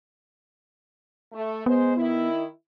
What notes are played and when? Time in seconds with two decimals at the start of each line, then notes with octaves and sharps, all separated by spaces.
1.32 A3
1.66 G#3 B3 C5
1.96 D#3 E4